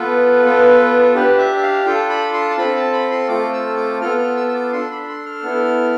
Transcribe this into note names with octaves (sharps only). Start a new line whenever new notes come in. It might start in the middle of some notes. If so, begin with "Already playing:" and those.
Already playing: B3 F4 A4 B4
B3 F4 A4
D4 G4 B4
E5
E5
F5
D4 F4 A4 G5
B5
C6
A5
C4 F4 A4 B5
A5
B5
C6
A3 C4 F4 A4 D6
E6
D6
B3 F4 A4 F6
F6
E6
E6
D6
D4 A4 C6
B5
C6
F6
B3 E4 A4